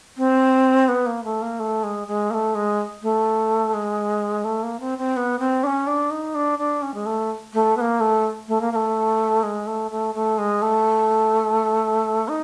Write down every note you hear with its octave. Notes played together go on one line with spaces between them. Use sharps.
C4
B3
A#3
A3
A#3
A3
G#3
G#3
A#3
A3
G#3
A3
G#3
A3
A#3
C4
C4
B3
C4
D4
C#4
D4
D#4
D4
D4
C#4
G#3
A3
A3
B3
A#3
A3
A3
A#3
A#3
A3
G#3
A3
A3
A3
G#3
A3
D#4